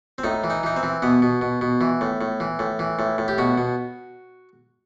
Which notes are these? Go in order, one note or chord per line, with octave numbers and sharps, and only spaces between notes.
C4
A2 D#4
E3
D#4
E3 D#4
C4
E3
B2 B3
B2
B2
B2
E3
A2
A2
E3
A2
E3
A2
A2
G4
B2 F#4
B2